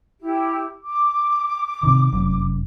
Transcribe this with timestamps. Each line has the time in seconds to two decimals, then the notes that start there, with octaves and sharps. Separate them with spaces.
0.20 E4 G4
0.85 D6
1.83 C3 D#3
2.12 F1 F#2